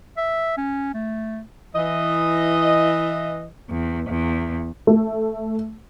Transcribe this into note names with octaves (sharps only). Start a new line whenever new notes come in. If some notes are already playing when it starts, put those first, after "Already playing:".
E5
C#4
A3
E3 D#5
E2
E2
A3